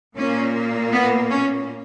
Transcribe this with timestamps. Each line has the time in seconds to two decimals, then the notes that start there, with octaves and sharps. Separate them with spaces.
0.16 A#2 A#3 C#4
0.92 B3
1.29 C#4